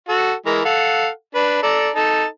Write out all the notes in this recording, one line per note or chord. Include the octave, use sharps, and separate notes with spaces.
F#4 A4
E3 G#3 A#4
A4 F5 F#5
D4 B4
A4 D5 A#5
D#4 A4 A5